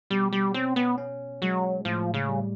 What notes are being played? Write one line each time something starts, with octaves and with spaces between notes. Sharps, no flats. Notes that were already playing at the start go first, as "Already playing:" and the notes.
B2 G3
G3
C4 C#4
B3
C#4
F#3 G#3
A2 F3
C#3
G3